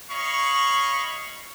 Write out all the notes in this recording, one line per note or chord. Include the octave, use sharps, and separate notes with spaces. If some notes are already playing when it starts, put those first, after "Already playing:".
C#5 D#5 F5 B5 C#6